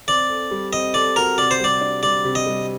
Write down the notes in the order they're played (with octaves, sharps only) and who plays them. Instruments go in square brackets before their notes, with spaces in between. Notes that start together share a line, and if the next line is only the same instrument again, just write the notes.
[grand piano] C4 [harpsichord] D5
[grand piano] A4
G3
[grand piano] C4 [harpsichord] D#5
[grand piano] A4 [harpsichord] D5
[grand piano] F#4 [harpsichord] A#4
[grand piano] C3 [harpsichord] D5
[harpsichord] C5
[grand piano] G3 [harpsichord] D5
[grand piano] D4
[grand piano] G3 [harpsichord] D5
[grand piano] C3
[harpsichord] D#5
[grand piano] G3